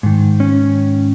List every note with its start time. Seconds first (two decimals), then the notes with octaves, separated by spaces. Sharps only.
0.03 G#2 D#3
0.40 C#4